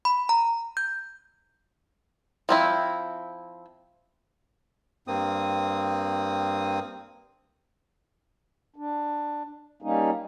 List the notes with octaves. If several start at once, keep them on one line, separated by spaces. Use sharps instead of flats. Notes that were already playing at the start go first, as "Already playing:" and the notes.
B5
A#5
G6
F3 C4 E4
G2 A#3 C4 D#6
D4
G3 A#3 C#4 D#4